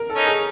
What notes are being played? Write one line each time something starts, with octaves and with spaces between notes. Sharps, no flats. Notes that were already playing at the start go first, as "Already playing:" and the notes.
Already playing: A#4
A4
C#4 D#4
G#4